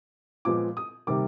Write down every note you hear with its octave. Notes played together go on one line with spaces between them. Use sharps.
A#2 F3 G#3 B3 D6
D#6
C3 D#3 G3 A#3 D6